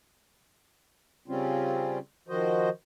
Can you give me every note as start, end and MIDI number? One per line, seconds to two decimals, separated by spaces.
1.28 1.99 49
1.28 1.99 55
1.28 1.99 60
1.28 1.99 61
1.28 1.99 65
2.28 2.69 51
2.28 2.69 53
2.28 2.69 66
2.28 2.69 72
2.28 2.69 75